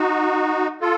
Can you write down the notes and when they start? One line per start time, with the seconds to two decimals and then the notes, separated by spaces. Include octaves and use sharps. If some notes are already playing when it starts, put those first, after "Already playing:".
Already playing: D#4 F#4
0.81 F4 A4